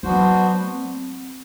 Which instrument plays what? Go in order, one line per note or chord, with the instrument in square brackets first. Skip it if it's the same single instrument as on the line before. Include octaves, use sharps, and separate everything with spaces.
[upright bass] F#3 [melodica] B3 D4 F#4 C5
[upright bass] C4